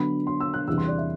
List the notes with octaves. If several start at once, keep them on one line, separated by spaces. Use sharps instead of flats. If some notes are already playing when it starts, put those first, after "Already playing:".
Already playing: D3 F#3 B3 B5
C6
E6
F#6
E2 C3 E3 G3 D4 E6
C6
D5
E5